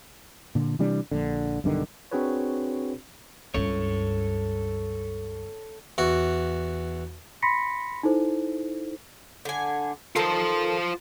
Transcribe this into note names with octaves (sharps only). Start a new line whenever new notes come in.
A#2 D3
C3 E3 G3 D4
A#1 D3
B1 G2 D3 D#3
C4 D4 F#4 G#4 B4 C#5
C#2 G2 A4 C#5
E2 F#4
B5 C6 A#6 B6 C#7
D#4 E4 A4 C5
D3 G#5
D#3 F4 A4 C5 A5